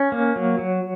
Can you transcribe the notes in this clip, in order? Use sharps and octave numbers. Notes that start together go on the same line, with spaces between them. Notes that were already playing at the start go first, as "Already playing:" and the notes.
Already playing: C#4
A#3
F#3
F#3